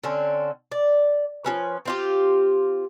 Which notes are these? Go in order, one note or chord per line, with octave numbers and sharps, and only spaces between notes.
D3 C4 C#4
D5
F3 C#4 B4
C4 F4 G4